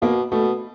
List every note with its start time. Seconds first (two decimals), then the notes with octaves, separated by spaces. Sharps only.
0.02 B2 A#3
0.32 B2 A3